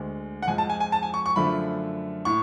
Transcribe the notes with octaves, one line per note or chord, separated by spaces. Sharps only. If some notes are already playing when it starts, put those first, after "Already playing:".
Already playing: D2 D3 G#3
F#5
F2 F3 G#3 G#5
A5
G#5
G#5
A5
G#5
C#6
C#6
F#2 D3 F3 A3 B5
A2 C#6